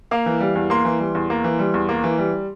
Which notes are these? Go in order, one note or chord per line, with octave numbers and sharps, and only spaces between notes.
A#3 F5
E3
G3
E2
A#3 C6
E3
G3
E2
A#3
E3
G3
E2
A#3
E3
G3